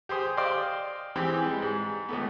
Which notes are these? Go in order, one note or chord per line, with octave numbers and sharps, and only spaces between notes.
G4 G#4 C5 D#6
C5 D5 D#5 F5 G5 C6
E3 C4 G4 G#4
G3 G#3
G#2
C#2 A3 B3